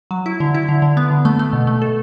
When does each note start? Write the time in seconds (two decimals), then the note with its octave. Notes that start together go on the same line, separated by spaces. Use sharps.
0.11 F#3
0.26 E4
0.40 D3
0.55 E4
0.69 D3
0.82 D3
0.97 B3
1.11 D3
1.25 A3
1.39 A3
1.53 B2
1.67 A3
1.82 A4